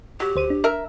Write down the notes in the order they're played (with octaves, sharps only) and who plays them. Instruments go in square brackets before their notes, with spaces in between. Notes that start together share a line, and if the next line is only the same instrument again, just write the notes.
[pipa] F#3 [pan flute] G4
[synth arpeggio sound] D2 C5 D#7
D4
[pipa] A#4 E5